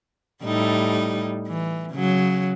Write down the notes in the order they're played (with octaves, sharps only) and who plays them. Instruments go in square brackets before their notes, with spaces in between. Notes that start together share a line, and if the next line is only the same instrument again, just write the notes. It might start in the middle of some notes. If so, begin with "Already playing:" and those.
[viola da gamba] A2 G3 D#4
E3
C#3 F#3